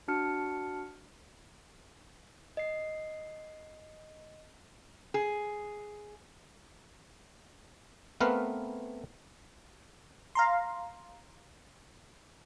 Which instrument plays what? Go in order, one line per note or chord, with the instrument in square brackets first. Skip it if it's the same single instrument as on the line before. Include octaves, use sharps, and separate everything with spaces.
[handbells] D4 F#4 A5 F6 C#7
[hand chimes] D#5 C7
[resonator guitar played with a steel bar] G#4
[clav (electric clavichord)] A3 B3 C4 A#4 B4 F5
[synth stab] F5 A#5 C6